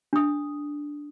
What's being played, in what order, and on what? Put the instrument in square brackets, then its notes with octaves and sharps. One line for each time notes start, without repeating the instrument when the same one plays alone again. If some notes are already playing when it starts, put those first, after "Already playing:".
[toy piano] D4 D#6